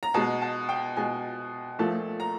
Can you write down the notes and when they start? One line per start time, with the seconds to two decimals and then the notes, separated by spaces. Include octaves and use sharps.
0.03 A#5
0.14 B2 G#3 A5
0.42 A5
0.69 G5
0.96 B2 G#3 G#5
1.79 A#2 F3 A3 A5
2.20 A#5